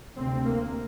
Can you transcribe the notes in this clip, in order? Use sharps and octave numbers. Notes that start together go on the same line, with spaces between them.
D2 C3 C4
A#3